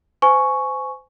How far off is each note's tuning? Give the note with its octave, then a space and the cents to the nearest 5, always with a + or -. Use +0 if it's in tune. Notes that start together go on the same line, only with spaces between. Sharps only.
C5 -30 G#5 +15 C#6 +0